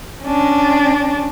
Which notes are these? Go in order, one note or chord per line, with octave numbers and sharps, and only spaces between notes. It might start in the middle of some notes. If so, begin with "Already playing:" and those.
C#4 D4